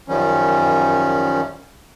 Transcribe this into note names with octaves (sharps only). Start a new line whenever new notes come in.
F#2 D#3 F3 G3 C#4